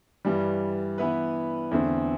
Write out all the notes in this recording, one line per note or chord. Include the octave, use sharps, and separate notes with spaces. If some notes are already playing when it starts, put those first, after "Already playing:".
G2 E3 G3
E3 B3 E4 B4
E2 D3 A3 C4